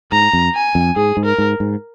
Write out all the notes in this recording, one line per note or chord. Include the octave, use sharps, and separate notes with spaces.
G#2 A#5
F2
G#5
F2
G#2 G#4
G#2
A#4
G#2
G#2